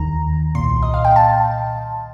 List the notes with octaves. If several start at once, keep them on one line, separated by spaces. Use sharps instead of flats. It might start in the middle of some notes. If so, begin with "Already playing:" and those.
Already playing: D#2 D#3 A#5
C2 A#2 C6
D#5
F5
G5
A5